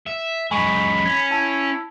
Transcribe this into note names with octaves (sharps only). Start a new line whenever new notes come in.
E5
F#2 G#3 G#5 B5 C#6
C#4 G#6
E4 A5